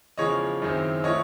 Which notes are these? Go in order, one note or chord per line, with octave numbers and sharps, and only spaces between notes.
E2 C#3 F3 G#3 C#5 D#5
F#2 D#3 G#3 C4 E4
D3 F3 A3 C#5 D#5